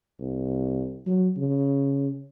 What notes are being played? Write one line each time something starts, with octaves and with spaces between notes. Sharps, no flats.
C2
F#3
C#3